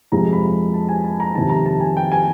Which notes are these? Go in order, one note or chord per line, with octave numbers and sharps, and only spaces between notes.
F2 C3 F3 G#3 A#5
B5
A5
G#5
A5
A#5
F2 C3 D#3 A5
A#5
A5
G#5
G5
G#5